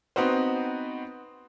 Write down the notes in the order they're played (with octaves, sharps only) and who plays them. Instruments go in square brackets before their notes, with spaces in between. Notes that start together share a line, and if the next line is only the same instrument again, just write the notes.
[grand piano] B3 C4 D#4 F#4 B4 C5